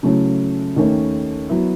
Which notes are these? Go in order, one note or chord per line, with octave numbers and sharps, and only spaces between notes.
C#3 F#3 A3 C#4 E4
D#2 D#3 A3 C#4
F#3 B3 E4